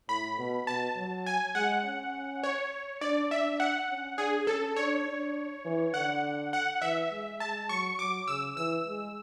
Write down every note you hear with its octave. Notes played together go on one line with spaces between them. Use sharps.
A2 B5
B2
B2 A5
F#3
G#5
G#3 F#5
C#4
C#5
D4 D5
D4 E5
F#5
C#4
D4 G#4
C#4 A4
D4 C#5
D4
E3
D3 F#5
F#5
E3 E5
G#3
G#3 A5
F#3 C#6
F#3 D6
C#3 E6
E3 E6
G#3